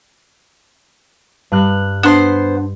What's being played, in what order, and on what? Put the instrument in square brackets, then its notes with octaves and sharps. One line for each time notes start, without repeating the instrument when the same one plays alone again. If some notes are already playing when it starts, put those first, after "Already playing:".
[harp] G2 F6 F#6
[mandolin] B3 C5 C6 [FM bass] D4